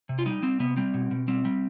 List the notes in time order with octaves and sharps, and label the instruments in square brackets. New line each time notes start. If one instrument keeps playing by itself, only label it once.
[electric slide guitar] C3
F4
G3 D#4
G3 C4
C3 B3
G3 C4
B2
B2
G3 C4
G3